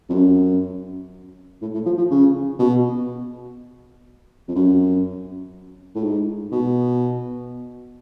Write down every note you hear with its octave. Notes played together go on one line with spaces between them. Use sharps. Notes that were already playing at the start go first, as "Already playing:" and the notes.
F2
F#2
A2
A2
F3
F3
C#3
B2
F2
F#2
A2
G#2
B2